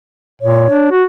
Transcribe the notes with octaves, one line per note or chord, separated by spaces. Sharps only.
A#2 C#5
D4
F#4